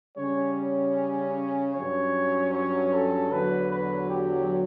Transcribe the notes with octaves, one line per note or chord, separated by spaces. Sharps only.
C#3 G3 C#4 C#5
G2 F#3 C#4 C#5
C#5
A4
E2 D3 F#3 B4
B4
G4